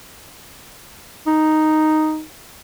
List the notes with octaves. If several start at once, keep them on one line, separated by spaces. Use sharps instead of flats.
D#4